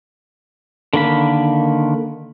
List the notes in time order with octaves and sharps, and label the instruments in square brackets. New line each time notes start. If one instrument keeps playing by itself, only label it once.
[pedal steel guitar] D3 D#3 A#3 B5